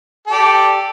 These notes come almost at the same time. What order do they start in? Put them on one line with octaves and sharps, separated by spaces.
A4 G4 D5